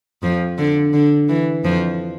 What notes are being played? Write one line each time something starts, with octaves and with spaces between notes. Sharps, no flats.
F2 F3
D3
D3
E3
F2 F3